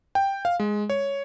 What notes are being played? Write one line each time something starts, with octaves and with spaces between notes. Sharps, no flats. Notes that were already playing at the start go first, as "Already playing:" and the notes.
G5
F5
G#3
C#5